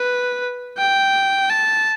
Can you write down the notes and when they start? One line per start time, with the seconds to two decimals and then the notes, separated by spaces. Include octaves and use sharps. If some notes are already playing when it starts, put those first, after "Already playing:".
Already playing: B4
0.77 G5
1.50 A5